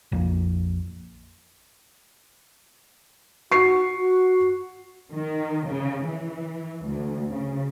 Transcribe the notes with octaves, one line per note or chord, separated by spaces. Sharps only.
A#1 F2 A#2
F#4 C#6 C7
F#4
D#3
C#3
E3
D2
C#3